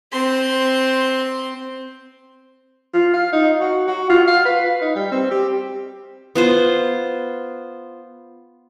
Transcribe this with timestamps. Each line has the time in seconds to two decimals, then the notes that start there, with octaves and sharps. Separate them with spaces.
0.12 C4 C6
2.94 F4
3.14 F5
3.33 D#4
3.60 F#4
3.88 F#4
4.09 F4
4.27 F5
4.45 B4
4.81 D#4
4.95 G3
5.12 C4
5.31 G4
6.35 B3 F4 C5